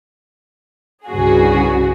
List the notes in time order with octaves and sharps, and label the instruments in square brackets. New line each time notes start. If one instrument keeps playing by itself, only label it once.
[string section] C2 G2 C#3 F#4 G#4